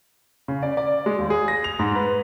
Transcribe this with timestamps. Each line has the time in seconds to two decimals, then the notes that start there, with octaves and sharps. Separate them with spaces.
0.48 C#3
0.63 D5
0.77 D5
1.06 G#3
1.19 D#2
1.30 G#4
1.48 A#6
1.64 F7
1.79 G#2
1.95 B4